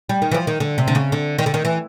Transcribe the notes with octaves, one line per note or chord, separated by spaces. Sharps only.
G3
D#3
E3
F3
D#3
D3
C3
D3
C#3
D3
D#3
D3
D#3
E3